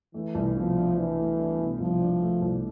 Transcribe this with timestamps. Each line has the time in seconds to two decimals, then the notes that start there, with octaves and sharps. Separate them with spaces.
0.14 E3 A3
0.35 C2
0.55 B2 F3
0.76 D4
0.97 E3 D4
1.18 A3
1.39 D4
1.60 B2
1.80 C2 F3
2.01 D4
2.22 A3
2.42 C2